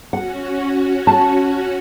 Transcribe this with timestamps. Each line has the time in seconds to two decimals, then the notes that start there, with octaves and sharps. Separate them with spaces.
0.13 C#4 F#4 F#5
1.07 A5